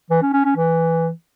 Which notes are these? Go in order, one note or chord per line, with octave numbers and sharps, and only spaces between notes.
E3
C#4
C#4
C#4
E3